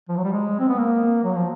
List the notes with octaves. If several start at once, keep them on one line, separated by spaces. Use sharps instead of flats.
F3
F#3
G3
G#3
C4
B3
A#3
F#3
F3